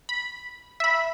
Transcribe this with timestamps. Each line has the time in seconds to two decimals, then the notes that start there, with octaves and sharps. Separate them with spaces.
0.09 B5
0.80 E5 B5